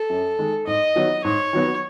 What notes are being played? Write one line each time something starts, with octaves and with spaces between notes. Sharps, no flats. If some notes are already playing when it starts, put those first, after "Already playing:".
Already playing: A4
F#2
D#3 G#3
G#2 D#5
D#3 F#3 B3 F#4
G#2 C#5
D#3 F#3 B3 F#4